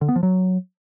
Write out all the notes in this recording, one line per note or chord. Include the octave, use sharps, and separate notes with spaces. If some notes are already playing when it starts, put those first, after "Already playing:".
D3
B3
F3
F#3